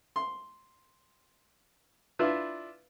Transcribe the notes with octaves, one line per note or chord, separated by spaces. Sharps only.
C6
D4 E4 F4 B4 E5